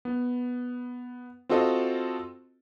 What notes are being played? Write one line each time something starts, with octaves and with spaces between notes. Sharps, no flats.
B3
C4 F4 F#4 A4 D#5